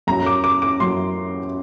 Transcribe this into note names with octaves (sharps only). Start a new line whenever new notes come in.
F#2 F#3 A#5
D6
D6
D6
F#2 F#3 C6